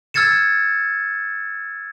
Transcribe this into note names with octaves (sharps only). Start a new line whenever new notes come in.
E6 F6 G#6 A6 C#7 E7